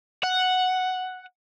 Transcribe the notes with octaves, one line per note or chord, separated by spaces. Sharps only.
F#5